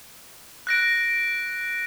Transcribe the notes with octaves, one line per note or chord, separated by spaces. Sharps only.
F#6 A#6 D7